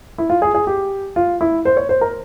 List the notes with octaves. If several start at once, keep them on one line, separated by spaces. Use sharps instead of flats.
E4
F4
G#4
G#4
G4
F4
E4
C5
C#5
C5
A#4